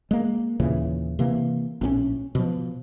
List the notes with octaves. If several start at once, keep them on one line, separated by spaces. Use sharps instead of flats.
G#3 A#3
D#2 A#2 C#3 E3
C3 E3 A#3
A#1 A2 C4 C#4
B2 F3